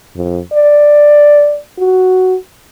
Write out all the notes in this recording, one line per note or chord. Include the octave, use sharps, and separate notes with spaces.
F2
D5
F#4